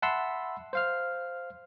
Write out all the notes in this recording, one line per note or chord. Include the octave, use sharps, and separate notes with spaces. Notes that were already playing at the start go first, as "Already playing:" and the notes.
E5 F#5 A5 B5 C6 E6
C5 F5 F6